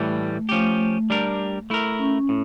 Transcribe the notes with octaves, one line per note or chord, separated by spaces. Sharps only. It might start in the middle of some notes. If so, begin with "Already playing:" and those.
Already playing: A2 E3 G3
A3
F3 A3 C#4 G4
G3 D4 G4 A#4
A3 E4 A#4
C#4
A2